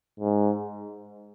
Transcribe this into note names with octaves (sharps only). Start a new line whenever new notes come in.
G#2